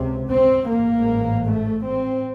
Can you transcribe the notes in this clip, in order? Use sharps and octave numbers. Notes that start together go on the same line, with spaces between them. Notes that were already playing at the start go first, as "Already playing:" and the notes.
Already playing: C#2 C3
C4
A1 G#2 A#3
A3
C4